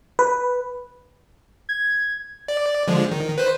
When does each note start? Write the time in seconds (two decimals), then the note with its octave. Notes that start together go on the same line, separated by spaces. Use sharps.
0.19 B4
1.69 G#6
2.48 D5
2.88 D3 F3 G#3
3.11 D#3
3.38 B4 C5